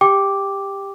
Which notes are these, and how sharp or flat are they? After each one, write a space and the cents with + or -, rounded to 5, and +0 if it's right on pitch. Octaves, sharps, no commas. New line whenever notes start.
G4 +15 G5 +0 D6 +0